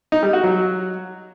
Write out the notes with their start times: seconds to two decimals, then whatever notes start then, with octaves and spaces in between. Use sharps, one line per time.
0.12 D#4
0.23 G3
0.33 F#4
0.44 F#3